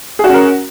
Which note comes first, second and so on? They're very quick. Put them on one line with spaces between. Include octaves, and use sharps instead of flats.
G#4 F#4 C#4 A#4